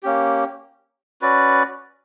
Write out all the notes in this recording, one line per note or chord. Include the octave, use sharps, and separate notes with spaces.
A#3 C#4 G4
C#4 F#4 B4 D5